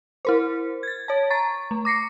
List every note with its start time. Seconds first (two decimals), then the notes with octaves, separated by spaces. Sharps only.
0.25 E4 A#4 C5
0.83 G#6 A6
1.08 C#5 A5
1.30 A#5 C#6 A6
1.71 A3
1.85 D6 A#6 C7 C#7